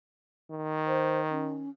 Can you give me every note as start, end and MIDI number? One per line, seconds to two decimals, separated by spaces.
0.52 1.69 51
0.87 1.20 72
1.30 1.70 61